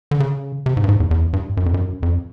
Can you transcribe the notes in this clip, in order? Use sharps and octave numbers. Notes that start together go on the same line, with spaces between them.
D3
C#3
C3
G#2
G2
G#2
E2
E2
G2
F#2
F2
F#2
F2